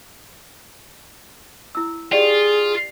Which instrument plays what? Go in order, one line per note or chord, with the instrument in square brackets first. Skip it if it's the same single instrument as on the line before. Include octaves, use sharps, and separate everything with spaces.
[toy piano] E4 E6
[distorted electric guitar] F4 [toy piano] G4 D5 G5 [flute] G#4